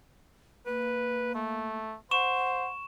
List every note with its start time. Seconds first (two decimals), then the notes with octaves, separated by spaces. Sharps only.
0.66 A#3 B4
1.35 A3
2.11 C5 F#5 C#6 E7